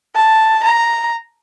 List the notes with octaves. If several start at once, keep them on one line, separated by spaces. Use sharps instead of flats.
A5
A#5